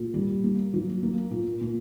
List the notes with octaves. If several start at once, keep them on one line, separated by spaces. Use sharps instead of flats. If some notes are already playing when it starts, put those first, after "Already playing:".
Already playing: A#2
G3
A#3
F#3
A#3
A#2
A#2